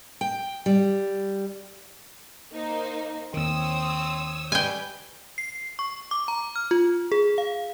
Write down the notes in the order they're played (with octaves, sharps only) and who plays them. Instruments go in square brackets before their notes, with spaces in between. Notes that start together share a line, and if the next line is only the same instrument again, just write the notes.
[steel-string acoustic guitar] G5
G3
[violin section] A#3 D#4 C5
[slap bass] D#2 D#3 [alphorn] C4 [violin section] C#5 D#6 E6
[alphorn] G3 [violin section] B4 G6 [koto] G5 G#5
[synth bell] C7
C#6
D6
A#5
F6
F4
G#4
F5